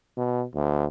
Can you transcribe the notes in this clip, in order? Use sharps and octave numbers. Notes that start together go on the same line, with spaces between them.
B2
D2